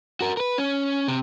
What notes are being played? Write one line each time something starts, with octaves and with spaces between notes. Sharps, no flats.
F#4 A#4
A#4 B4
C#4
C3